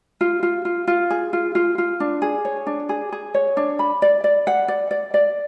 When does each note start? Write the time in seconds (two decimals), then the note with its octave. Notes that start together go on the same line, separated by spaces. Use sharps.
0.21 F4
0.43 F4
0.65 F4
0.87 F4
1.10 G#4
1.33 F4
1.55 F4
1.78 F4
2.00 D4
2.22 G#4
2.45 C#5
2.67 D4
2.89 G#4
3.12 G#4
3.34 C#5
3.57 D4
3.79 B5
4.02 D5
4.24 D5
4.47 F#5
4.68 D5
4.91 D5
5.14 D5